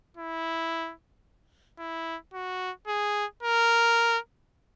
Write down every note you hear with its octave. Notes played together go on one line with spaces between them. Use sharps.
E4
E4
F#4
G#4
A#4